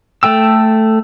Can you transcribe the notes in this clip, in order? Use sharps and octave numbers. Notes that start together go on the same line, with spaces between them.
A3 A4 G5 E6